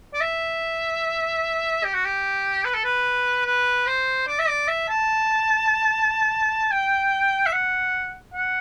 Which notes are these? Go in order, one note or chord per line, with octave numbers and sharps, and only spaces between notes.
D5
E5
G4
F#4
G4
B4
A4
B4
B4
C5
D5
E5
D5
E5
A5
G5
E5
F#5
F#5